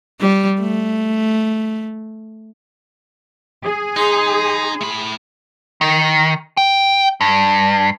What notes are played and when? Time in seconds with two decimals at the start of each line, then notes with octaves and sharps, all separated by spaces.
0.20 G3
0.60 A3
3.64 G#4
3.96 D#4 C6
4.81 A2 B5
5.81 D#3
6.57 G5
7.21 G2